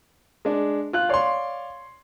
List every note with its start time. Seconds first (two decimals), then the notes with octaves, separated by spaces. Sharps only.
0.45 G#3 D4
0.93 F4 F#6
1.09 C#5 D5 F5 C6